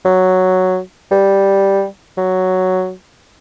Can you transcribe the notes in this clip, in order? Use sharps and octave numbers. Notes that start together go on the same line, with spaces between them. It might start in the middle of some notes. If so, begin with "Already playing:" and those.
F#3
G3
F#3